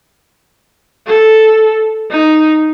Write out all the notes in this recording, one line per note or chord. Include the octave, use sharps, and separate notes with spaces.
A4
D#4